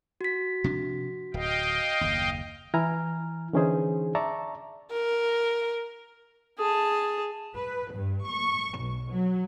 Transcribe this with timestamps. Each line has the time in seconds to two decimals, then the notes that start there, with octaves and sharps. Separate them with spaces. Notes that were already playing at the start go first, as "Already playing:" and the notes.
0.21 F#4 B6
0.64 C3 F3 D4
1.34 D1 D#5 F5 G5
2.01 F#1 D#2
2.74 E3 E4 G#5 A#5 F6
3.53 D3 E3 C#4 D#4 G#4 C5
4.15 D5 E5 A5 A#5 C#6
4.91 A#4
6.59 G#4 A5
7.55 B4
7.93 G2
8.27 C#6
8.79 B1
9.11 F#3